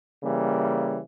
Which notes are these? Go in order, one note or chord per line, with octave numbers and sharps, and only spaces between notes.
C#3 E3 G3 A#3